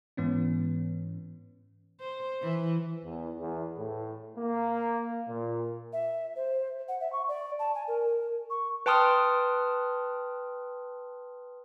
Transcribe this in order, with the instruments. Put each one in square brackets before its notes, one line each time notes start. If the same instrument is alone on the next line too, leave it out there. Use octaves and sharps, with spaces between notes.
[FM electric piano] G#2 E3 B3 C#4
[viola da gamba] C5
E3
[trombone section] E2
E2
A2
A#3
A#2
[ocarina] E5
C5
F#5
E5
C#6
D5
A5
G#5
A#4
C#6
[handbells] B4 G5 A5 C6 D#6 F6